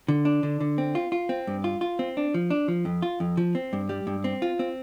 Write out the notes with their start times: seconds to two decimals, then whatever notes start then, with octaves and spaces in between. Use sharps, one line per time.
0.08 D3
0.25 D4
0.43 D3
0.61 D3
0.78 C4
0.95 F4
1.12 F4
1.29 C4
1.47 G2
1.64 F4
1.81 F4
1.99 C4
2.17 D4
2.34 F3
2.50 D4
2.68 F3
2.85 F2
3.02 F4
3.20 F2
3.37 F3
3.55 C4
3.73 G2
3.89 G3
4.07 G2
4.24 C4
4.42 F4
4.59 C4